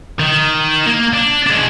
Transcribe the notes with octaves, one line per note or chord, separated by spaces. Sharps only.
D#3
A#3
D4
G#3 D4